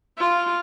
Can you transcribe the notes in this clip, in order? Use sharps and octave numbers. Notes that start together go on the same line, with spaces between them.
F4